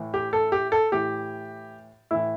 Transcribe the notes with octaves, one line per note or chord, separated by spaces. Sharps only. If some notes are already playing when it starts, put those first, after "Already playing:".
Already playing: A2 E3
G4
A4
G4
A4
A2 E3 G4
A2 E3 E4